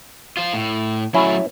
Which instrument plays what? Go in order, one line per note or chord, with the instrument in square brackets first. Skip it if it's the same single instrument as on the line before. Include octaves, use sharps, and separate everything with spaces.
[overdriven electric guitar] F4 C5
A2
[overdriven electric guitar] F#3 A3 [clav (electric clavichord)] C#4 E4